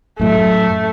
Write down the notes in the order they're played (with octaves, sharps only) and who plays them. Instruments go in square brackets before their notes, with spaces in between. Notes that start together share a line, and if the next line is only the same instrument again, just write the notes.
[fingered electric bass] F#2 A2 F#3 [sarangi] A3